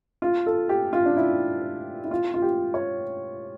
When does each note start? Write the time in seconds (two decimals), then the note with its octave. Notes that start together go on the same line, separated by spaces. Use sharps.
0.22 F4
0.46 A4
0.69 G4
0.93 F4
1.05 D4
1.17 E4
2.04 E4
2.11 F4
2.34 F4
2.42 G4
2.74 C#5